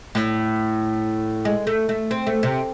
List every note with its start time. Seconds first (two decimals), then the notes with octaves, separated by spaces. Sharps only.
0.15 A2
1.45 G#3
1.67 A3
1.89 A3
2.11 C4
2.27 A3
2.43 C3